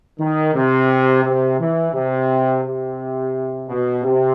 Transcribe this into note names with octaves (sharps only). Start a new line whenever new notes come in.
D#3
C3
C3
E3
C3
C3
B2
C3